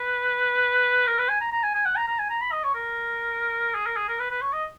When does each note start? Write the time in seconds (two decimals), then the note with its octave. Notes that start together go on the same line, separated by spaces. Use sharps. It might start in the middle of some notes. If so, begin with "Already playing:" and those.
Already playing: B4
1.07 A#4
1.18 B4
1.29 G#5
1.41 A#5
1.52 A#5
1.63 G#5
1.74 G#5
1.85 F#5
1.96 A#5
2.08 A#5
2.19 G#5
2.30 A#5
2.41 B5
2.52 D#5
2.64 C#5
2.75 A#4
3.75 G#4
3.86 A#4
3.97 G#4
4.08 A#4
4.19 B4
4.31 B4
4.42 C#5
4.53 D#5